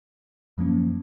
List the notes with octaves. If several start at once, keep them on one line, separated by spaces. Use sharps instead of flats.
F#2 F3 A#3 C#4